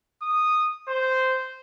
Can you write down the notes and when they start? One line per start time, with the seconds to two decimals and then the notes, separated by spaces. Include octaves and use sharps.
0.22 D#6
0.88 C5